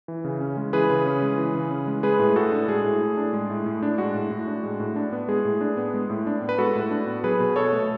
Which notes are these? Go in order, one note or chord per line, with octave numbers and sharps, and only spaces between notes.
E3
C#3
C#4
G#3
E3 G#4 B4
C#3
C#4
G#3
E3
C#3
C#4
G#3
G#3 G#4 B4
A2
A2 F#4 A4
D4
G#3 G#4
A2
A2
D4
G#3
A2
A2
D4
G#3 F#4
A2
A2
D4
G#3
A2
D4
B3
G#3 G#4
A2
D4
B3
G#3
A2
D4
B3
B4
G#3 F#4 A4
A2
D4
B3
F#3 G#4 B4
B2
B2 A4 C#5
A3